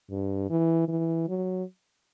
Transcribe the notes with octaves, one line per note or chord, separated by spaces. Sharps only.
G2
E3
E3
F#3